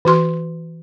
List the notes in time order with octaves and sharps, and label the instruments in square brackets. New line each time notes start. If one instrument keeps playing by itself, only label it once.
[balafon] E3 F#4 C6